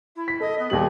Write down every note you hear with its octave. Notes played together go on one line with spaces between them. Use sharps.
E4
B6
A4 D#5
B3
D#2 G3 G#4 F#7